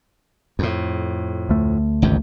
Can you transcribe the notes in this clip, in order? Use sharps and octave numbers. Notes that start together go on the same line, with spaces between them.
F2 A2
D2 A3
G#1 C#2 G2